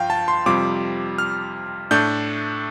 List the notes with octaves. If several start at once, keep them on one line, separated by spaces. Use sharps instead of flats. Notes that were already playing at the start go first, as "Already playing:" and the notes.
Already playing: G2 F3 F5 G5
A5
C6
F2 C3 G3 F4 D6
F6
A2 A3 D4 G6